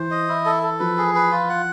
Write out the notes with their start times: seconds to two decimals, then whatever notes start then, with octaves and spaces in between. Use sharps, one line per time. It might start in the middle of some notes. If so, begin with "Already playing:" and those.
Already playing: E3 C5
0.11 D#5
0.29 E4
0.46 A4
0.63 A4
0.80 F3 B4
0.97 G#4
1.15 B4
1.31 F4
1.49 F#5